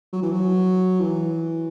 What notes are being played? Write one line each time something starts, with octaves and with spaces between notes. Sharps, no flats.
F#3
E3
F#3
E3